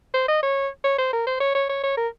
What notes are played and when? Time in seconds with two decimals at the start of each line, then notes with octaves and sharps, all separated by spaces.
0.14 C5
0.28 D#5
0.42 C#5
0.84 C#5
0.98 C5
1.13 A#4
1.27 C5
1.40 C#5
1.55 C#5
1.69 C#5
1.83 C#5
1.97 A#4